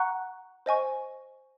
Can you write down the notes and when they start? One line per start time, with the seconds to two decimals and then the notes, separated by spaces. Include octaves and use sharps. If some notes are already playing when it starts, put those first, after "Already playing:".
Already playing: F#5 A#5 C#6 F#6
0.66 C5 D#5 G#5 C#6